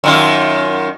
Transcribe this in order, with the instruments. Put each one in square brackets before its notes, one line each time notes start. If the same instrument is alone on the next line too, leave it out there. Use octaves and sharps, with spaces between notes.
[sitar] F#2 D#3 F4